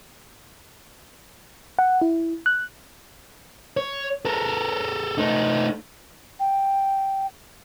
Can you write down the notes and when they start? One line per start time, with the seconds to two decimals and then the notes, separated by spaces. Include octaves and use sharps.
1.79 F#5
2.02 E4
2.46 F#6
3.77 C#5
4.25 A4 A#4
5.18 A3 D#4
6.40 G5